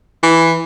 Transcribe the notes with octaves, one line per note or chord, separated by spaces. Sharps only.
E3